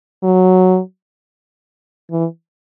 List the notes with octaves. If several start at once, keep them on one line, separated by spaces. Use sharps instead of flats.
F#3
E3